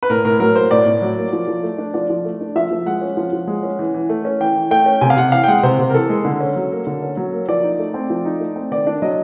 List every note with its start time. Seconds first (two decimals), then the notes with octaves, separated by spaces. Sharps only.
0.03 B4
0.10 A2 A#4
0.25 A2 A#4
0.40 F#3 A#4
0.55 A#3 C5
0.71 A2 D5
0.86 A2
1.02 F#3
1.17 A#3
1.33 F3
1.47 F3
1.63 A3
1.78 D4
1.94 F3 D5
2.10 F3
2.25 A3
2.41 D4
2.56 F3 E5
2.71 F3
2.86 G#3 F#5
3.02 C#4
3.17 F3
3.33 F3
3.47 G#3
3.63 C#4
3.79 E3
3.94 E3
4.09 A3
4.25 C#4
4.40 E3 G5
4.56 E3
4.71 A3 G5
4.86 C#4
5.01 C3 G#5
5.10 F5
5.17 C3 F#5
5.32 E3 F5
5.44 G5
5.48 G#3 F#5
5.63 C3 C5
5.79 C3
5.90 A#4
5.94 E3 A4
6.09 G#3
6.25 D3
6.41 C#4
6.56 F#3
6.72 A#3
6.87 D3
7.02 C#4
7.17 F#3
7.33 A#3
7.48 F3 D5
7.63 D#4
7.79 A3
7.94 C4
8.10 F3
8.25 D#4
8.40 A3
8.56 C4
8.71 D#3 D5
8.87 D4
9.02 F#3 D#5